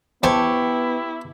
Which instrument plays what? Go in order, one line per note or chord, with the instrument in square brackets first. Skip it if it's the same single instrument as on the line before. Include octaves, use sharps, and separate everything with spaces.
[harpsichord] E2 C5 G#5 [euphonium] B3 [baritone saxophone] E4 [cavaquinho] G4 A5 C#6